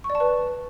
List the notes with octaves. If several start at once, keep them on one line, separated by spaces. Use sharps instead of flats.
C#6
D5
A5
B4